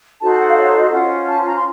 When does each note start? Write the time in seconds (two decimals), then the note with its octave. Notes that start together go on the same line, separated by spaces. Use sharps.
0.20 D#4 F#4 A4 C5 A5
0.30 A5
0.38 F#5
0.48 F5
0.56 C#5
0.74 D#5
0.91 C#4 F4 C5 F#5
1.26 A5
1.45 A#5
1.55 C6